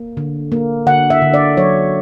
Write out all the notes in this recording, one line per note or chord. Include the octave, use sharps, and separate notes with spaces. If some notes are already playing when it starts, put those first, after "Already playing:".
Already playing: A#3
D3
A#3
D3 F#5
E5
D3
D5
F#3 C#5